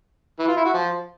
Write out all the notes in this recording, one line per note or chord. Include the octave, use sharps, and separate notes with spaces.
E3
F4
E4
F#4
F3